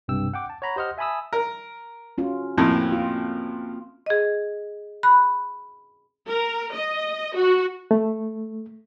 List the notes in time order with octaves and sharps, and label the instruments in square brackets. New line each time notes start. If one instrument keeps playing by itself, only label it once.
[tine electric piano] B1 G2 C3 G5 E6
F#5 G5 D6
A5
C#5 F#5 A#5 B5
G4 C5 D#5 F#5 F6
E5 G#5 A5 B5 D#6 E6
[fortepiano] A#4
[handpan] C#4 F4 F#4
[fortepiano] F2 A2 [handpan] A#3 C4
[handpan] F4
[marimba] G#4 D#5
B5 F#6
[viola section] A#4
D#5
F#4
[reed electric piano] A3